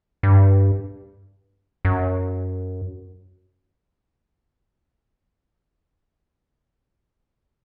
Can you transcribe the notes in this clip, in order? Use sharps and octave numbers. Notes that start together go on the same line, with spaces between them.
G2
F#2